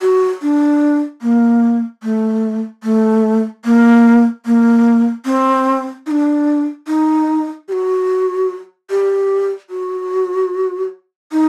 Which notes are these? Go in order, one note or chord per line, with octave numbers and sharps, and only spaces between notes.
F#4
D4
A#3
A3
A3
A#3
A#3
C4
D#4
D4
D#4
G4
F#4
G4
F#4
D#4